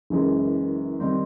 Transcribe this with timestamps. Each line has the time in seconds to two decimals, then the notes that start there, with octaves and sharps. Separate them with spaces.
0.10 F#1 F#2 C#3 E3 G#3
1.00 D#3 G3 C4